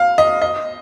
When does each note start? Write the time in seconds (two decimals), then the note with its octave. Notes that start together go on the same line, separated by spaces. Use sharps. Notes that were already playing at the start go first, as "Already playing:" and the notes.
Already playing: F5
0.18 D#5
0.42 D#5